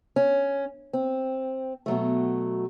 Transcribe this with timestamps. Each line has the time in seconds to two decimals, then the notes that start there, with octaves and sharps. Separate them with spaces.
0.16 C#4
0.93 C4
1.86 B2 F#3 A3